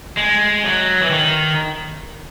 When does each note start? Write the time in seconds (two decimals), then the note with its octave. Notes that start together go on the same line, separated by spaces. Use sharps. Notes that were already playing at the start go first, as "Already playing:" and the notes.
0.17 G#3
0.64 F#3
1.02 E3
1.10 D#3